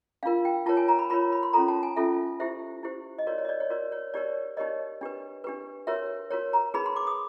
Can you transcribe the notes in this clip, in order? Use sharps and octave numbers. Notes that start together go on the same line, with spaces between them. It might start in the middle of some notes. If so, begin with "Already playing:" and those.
D4 F4 A#4 F5
G5
F4 A#4 C#5 A5
G#5
A#5
B5
F4 A#4 C#5 B5
B5
C6
C#4 F4 A4 A#5
A5
G#5
C#4 F4 A4 E5
E4 G4 C5 E5
E4 G4 C5
D#5
F#4 A#4 C#5 D5
C#5
D#5
D5
C#5
F#4 A#4 C#5 D5
C#5
D#4 G4 A#4 C#5 D5
D#4 G4 A#4 C#5 D#5
D4 G4 B4
D4 G4 B4
F#4 A#4 C#5 E5
F#4 A#4 C#5
A#5
D#4 G#4 B4 B5
C6
D6
D#6